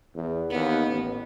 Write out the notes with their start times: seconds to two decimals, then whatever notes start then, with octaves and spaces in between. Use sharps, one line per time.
0.15 E2
0.50 D#2 B3
0.87 A1